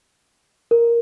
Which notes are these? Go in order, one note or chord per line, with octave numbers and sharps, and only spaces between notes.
A#4